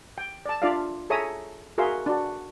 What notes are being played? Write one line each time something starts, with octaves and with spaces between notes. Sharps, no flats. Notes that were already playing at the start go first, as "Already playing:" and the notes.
G5
D5 A5
D4 F4 D5 E5 F5
G#4 A4 C#5 E5 A#5 D#6
F#4 G#4 A#4 E5 F5 C6
D4 F#4